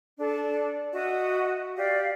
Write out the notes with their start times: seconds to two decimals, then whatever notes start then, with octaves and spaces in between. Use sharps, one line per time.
0.18 D4 A4
0.93 F#4 D#5 E5 F#5
1.76 G4 D5 F5